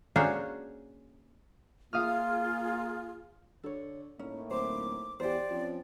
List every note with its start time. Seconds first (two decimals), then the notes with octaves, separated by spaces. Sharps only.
0.16 A#3 C#4 D4 F#4 G#4 C5
1.93 A#3 F4 G#4 F5 D#6 F6
3.63 D3 A4 C#5
4.19 A2 A#3 C#4 D#4
4.51 D1 C5 D6
5.20 E2 G4 C5 D5
5.50 F3 C4 C#4